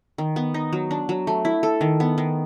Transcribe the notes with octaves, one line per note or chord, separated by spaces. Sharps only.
D#3
B3
D#4
F#3
D4
F#3
A3
E4
A4
D#3
B3
D#3